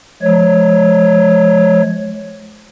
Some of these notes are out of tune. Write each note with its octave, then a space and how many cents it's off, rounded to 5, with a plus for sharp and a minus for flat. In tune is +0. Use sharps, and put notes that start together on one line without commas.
F3 +0 G#3 +35 C#5 +0